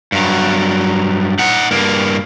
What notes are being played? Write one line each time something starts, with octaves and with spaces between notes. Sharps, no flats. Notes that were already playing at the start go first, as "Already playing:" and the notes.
G2 F#3
D#4 F#5
G2 A#3